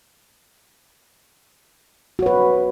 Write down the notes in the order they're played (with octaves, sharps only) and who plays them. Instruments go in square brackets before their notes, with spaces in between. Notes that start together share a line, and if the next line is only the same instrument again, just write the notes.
[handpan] F#4
C#5
B4